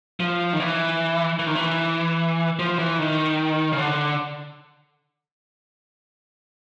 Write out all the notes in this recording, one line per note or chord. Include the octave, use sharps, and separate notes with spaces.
F3
D#3
E3
E3
D#3
E3
F3
E3
D#3
C#3
D3